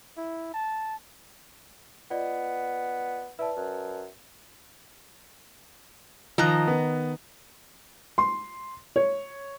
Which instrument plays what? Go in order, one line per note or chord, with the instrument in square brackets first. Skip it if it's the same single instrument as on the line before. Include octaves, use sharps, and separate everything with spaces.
[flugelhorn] E4
A5
[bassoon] B3 [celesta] F4 D5 D#5
[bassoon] E4 [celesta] B4 D5 A5
[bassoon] F#2
[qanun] D#3 D#5 A#5 [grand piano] F3 F#6
[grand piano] B3
[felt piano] C6
C#5